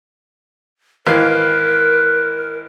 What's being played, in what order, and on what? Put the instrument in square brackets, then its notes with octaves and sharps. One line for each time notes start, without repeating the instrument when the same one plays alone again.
[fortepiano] G#1 E3 F5 [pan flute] A#4 [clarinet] B4